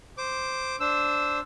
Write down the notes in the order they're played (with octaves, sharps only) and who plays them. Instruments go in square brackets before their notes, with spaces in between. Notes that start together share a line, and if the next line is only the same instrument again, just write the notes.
[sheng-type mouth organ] C5 D6
[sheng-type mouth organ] D4 C5 [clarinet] E6